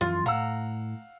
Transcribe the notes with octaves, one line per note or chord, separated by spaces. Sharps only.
F#2 E3 F3 F4
A2 F5 F#5 A#5 E6